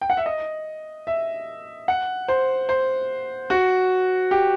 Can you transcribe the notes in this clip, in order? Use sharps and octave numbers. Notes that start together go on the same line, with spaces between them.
G5
F#5
E5
D#5
E5
F#5
C5
C5
F#4
G4